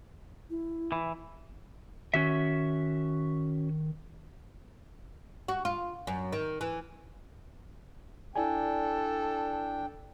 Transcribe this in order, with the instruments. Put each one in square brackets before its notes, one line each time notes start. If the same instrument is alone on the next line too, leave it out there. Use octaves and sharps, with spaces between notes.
[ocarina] E4
[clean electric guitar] E3
[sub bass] D#3 [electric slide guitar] C#4 F#4 E5
[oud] F#4
F4
F#2
D#3
E3
[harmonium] D4 G5 [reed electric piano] E4 D5 G#5 [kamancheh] A4